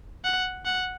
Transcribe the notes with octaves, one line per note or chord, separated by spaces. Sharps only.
F#5
F#5